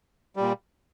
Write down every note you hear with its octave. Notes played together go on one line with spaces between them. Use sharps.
A#2 G3